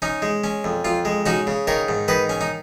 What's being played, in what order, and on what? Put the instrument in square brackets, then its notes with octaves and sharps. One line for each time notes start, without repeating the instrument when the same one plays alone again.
[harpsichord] C#4 D#4
G#3
C#4
F2
F2 F4
G#3
C#4 D#4 F#4
C#3
D#3 A#4 C#5
G#2
D#3 B4 D#5
C#4
D#4